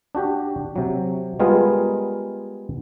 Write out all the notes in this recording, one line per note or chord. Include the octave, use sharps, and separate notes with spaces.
D4 F#4 G4
C3 F#3
G3 G#3 B3 F4 G#4 A#4